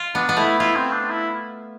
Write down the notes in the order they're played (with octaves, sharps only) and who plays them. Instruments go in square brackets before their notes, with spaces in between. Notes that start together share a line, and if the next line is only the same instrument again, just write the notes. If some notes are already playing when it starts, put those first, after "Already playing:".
Already playing: [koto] F4
[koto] B3 [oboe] D4
[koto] B3
[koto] A3 [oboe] E4
[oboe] E4 [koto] F4
[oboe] C4
D4
E4